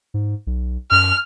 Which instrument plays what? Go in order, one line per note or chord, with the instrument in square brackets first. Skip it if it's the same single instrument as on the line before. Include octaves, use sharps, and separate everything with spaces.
[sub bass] G#2
B1
[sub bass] F#2 [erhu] F6